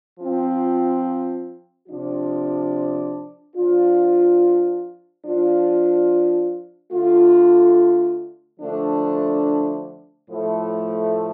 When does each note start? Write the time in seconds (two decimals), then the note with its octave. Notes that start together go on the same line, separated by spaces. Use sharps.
0.20 F3 C4 F4
1.88 C3 F3 D4 F4
3.56 F3 D4 F4
5.25 F3 D4 F4
6.92 D3 A3 F4
8.60 D3 F3 A3 D4
10.28 A2 F3 A3